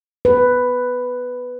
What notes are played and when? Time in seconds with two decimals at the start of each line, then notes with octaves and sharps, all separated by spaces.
0.25 B4